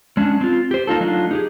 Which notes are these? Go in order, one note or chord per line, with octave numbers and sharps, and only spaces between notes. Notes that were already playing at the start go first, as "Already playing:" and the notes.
G#3 C#4 D4
C4 F4
G4 C5
A#3 D#4 F4 A4
F#3 A3 D4 D#4 F4
D#4 G4 G#4